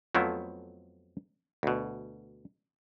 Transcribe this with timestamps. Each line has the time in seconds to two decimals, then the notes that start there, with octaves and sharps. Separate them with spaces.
0.15 F2 F3 F#3 A3 B3 E4
1.63 D2 B2